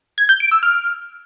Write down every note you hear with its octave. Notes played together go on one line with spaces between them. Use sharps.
G#6
G6
D7
E6
F6